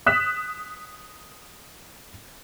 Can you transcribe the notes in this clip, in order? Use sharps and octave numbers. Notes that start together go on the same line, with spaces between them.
D#6 F#6 B6 E7